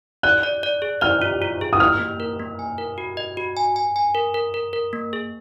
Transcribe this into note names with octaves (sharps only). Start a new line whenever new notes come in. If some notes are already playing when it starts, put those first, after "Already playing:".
D5 F#6
D5
D5
G#4
D5 F6
F4
F4
G#4
D#6
A#3 F6
A#3
A#4
A#3
G#5
A#4
F#4
D#5
F#4
G#5
G#5
G#5
A#4
A#4
A#4
A#4
A#3
G#4